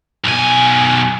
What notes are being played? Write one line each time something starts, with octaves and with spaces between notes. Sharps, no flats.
B1 G#5